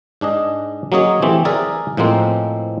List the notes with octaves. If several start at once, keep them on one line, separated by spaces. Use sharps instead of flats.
G#2 D4 G#4 D#5
F#3 A#3 C#4 G#4 C#5 D#5
E3 A3 C4 G4
G#4 A#4 D5 E5 G#5 A#5
A2 F3 G#3 A#3 C4